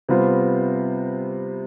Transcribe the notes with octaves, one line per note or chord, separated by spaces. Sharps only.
C3 G3 B3 F4 C5